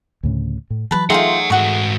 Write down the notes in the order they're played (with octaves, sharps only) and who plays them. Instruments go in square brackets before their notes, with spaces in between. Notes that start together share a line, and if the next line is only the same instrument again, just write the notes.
[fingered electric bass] D2 A2 C#3
A2
[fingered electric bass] E3 F#3 [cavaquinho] B4 A5
[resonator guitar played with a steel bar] A3 D#4 G#4 [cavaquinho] F4 G5 C6 [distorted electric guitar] C#5 F#5
[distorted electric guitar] G#2 F#4 [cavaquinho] F#5 C#6